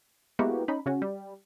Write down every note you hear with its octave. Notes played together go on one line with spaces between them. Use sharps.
G#3 A#3 B3 E4 F#4 G4
C#4 D#4 B5
C#3 C#4 F#4
G3